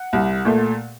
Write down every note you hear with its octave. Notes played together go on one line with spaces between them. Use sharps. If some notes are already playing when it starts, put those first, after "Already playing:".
Already playing: F#5
C2
A#2 A3